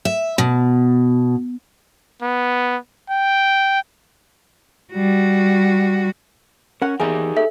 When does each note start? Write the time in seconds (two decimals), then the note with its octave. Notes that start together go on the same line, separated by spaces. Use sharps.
0.05 E5
0.38 B2
2.22 B3
3.10 G5
4.93 G3 F#4
6.82 C#4 A#4 F#5
7.00 E2 D#4 G4 G#4 A#4 E5
7.37 A4 E5